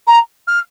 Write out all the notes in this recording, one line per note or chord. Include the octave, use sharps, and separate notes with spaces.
A#5
F6